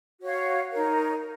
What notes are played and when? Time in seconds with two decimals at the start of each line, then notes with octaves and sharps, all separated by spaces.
0.20 F#4 C#5 F5
0.71 D#4 A#4 C#5